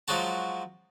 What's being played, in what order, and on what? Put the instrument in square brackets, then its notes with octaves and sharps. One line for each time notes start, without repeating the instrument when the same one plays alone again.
[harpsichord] F3 F#3 G#3 F#4 A5